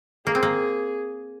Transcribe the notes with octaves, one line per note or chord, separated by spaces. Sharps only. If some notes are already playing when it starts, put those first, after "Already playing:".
A#3 G#4
C4
A#3